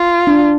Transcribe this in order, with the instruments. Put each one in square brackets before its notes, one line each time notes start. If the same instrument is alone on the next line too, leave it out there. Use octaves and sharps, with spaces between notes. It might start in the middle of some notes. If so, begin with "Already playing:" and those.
Already playing: [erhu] F4
[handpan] D4